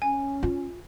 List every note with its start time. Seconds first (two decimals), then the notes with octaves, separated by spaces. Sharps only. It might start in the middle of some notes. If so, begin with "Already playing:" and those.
0.02 C#4 G#5
0.43 F4